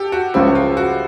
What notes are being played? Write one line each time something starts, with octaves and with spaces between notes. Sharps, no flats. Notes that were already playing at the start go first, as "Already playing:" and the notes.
Already playing: G4 A4
F#4
C#2 C#3 F3 E4
F4
F#4